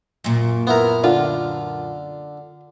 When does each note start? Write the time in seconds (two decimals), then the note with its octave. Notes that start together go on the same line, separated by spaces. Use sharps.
0.24 F#2 A#2
0.67 B3 E4 A#4
1.04 D3 F4